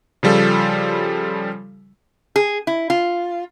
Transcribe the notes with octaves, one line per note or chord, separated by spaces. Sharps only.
C#3 F3 G3 F4 A4
G#4
E4
F4